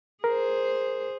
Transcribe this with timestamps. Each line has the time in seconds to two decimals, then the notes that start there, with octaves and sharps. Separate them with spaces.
0.24 G#4 A#4 C5